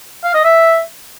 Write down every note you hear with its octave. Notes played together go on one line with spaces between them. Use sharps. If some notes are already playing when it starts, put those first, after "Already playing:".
F5
D#5
E5